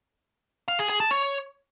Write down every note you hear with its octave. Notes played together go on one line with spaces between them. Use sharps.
F5
G#4
G#4
A5
C#5